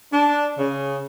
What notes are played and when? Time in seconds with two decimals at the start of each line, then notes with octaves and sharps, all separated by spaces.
0.11 D4
0.57 C#3